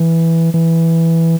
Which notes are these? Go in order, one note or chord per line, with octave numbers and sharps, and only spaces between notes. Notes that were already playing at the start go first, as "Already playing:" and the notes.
Already playing: E3
E3